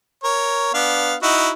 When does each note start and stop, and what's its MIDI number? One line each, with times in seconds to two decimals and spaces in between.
0.24 0.69 70
0.24 0.69 73
0.74 1.15 59
0.74 1.15 62
0.74 1.15 77
1.22 1.50 63
1.22 1.50 64
1.22 1.50 66